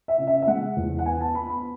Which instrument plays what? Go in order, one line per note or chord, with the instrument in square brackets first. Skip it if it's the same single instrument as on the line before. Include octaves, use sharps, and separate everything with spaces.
[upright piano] E5
C#3
E5
E5
G#3 F#5
E2
F#5
B3 G#5
A5
B3 B5
B5